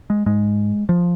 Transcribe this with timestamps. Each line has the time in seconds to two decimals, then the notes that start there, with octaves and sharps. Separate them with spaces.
0.10 G#3
0.26 G#2 G#3
0.89 F3